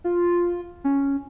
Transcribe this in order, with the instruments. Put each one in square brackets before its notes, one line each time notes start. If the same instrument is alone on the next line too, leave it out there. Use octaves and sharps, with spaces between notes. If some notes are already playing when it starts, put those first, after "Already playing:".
[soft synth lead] F4
C#4